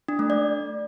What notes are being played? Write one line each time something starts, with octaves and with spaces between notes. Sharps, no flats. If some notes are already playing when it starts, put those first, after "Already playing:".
D4
A3
D5